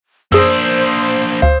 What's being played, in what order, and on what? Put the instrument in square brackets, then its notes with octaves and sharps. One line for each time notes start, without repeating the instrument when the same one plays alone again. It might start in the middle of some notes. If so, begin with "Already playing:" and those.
[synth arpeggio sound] F#2 G#4 [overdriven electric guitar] A#3 D4 [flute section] C5 [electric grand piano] D#6 E6
[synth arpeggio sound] D2 F5 [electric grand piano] C5